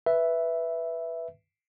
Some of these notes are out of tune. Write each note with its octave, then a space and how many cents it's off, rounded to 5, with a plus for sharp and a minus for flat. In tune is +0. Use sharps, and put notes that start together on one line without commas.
B4 +0 E5 +0